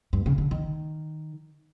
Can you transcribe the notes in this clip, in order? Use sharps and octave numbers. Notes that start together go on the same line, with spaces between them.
G2
C#3
D3
D#3